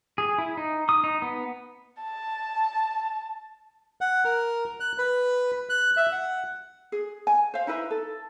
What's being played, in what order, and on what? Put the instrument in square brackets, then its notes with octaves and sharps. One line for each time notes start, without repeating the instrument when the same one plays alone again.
[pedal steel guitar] G#4
E4
D#4
D#6
D#4
B3
[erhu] A5
[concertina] F#5
A#4
F#6
B4
F#6
E5
F#5
[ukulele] G#4
G#5
C5 F5
D#4 E4 B4 E5
A4